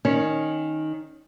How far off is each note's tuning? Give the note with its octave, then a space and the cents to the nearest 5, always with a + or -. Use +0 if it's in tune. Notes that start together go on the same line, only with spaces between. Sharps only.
D#3 +5 C#4 +0